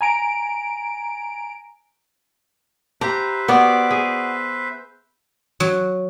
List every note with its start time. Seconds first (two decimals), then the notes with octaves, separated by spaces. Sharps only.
0.01 G#5 A#5 D7
3.01 G4 B4 C5 E5 A#5
3.48 B3 F#4 D5
3.91 G#4
5.60 F#3